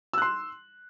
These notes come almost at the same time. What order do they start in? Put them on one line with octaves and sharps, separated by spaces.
E6 F#6 C6